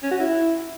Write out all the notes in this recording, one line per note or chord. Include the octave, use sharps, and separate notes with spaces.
C#4
F#4
E4